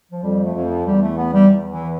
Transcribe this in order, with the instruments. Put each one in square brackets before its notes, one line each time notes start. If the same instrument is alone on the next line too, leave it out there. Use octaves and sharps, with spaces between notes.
[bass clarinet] F3
[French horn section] F2 [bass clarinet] G3
[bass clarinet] A3
[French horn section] F2
[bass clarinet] F3
[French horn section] E2 [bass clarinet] G3
[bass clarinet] A3
B3
G3
[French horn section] E2
[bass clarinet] E3